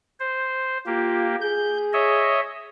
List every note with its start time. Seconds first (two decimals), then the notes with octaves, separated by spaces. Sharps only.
0.20 C5
0.86 A#3 F4 G4
1.41 G#4 G6
1.93 C#5 D#5 E5